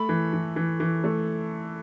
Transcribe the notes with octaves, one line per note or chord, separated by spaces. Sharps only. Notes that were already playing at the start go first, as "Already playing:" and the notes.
Already playing: A3 B5
E3
E3
E3
E3
A3